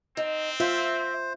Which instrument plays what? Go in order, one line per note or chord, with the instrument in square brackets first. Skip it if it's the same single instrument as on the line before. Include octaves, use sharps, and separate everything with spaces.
[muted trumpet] C4 [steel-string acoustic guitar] D#4
[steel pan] F4 [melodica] C5 [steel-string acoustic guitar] E5